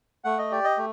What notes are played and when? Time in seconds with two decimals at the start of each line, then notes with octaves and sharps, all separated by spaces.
0.24 A3 F#5
0.38 D#5
0.52 G4 D5
0.64 D#5
0.77 A3